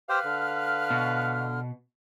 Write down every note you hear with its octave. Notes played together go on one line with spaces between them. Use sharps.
G4 B4 C5 F5 G5 F6
D3
B2